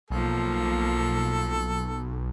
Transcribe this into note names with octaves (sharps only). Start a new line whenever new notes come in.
B1 F3 A#3 A4